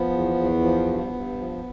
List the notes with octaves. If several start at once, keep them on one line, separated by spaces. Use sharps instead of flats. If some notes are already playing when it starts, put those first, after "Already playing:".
Already playing: F3 B3
E2
E2
F3
G2
G2
F3